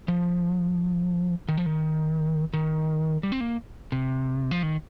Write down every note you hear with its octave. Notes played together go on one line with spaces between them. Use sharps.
F3
D#3
F3
D#3
D#3
G3
C4
A#3
C3
F3
D#3